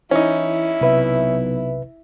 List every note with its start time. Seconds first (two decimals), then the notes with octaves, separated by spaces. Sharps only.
0.11 E3 C#4 D#4 E4
0.81 B1 C3 B4 E5